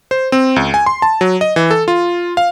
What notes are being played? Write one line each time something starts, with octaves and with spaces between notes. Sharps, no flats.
C5
C4
C#2
G#5
C6
A5
F#3
D#5
E3
A4
F4
F5